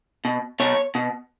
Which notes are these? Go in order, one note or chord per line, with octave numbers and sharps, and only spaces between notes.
B2
B2 C#5
B2